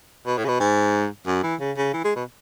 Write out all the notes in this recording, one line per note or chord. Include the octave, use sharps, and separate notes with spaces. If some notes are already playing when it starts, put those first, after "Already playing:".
B2
A2
C#3
B2
G#2
F#2
E3
C#3
C#3
E3
G#3
B2